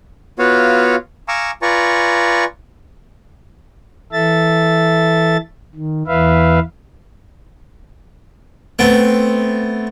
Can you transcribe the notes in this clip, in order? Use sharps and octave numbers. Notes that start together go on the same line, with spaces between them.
B3 F4 F#4 C#5 F5
F5 G#5 A#5 C#6 D6 E6
F4 B4 D5 G#5 A#5 C#6
E3 A4 E5 A6
D#3
E2 E3 B4 E5 F5
A3 B3 C4